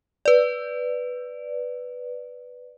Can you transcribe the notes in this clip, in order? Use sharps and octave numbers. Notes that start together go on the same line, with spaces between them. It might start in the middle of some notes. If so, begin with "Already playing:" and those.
B4 D5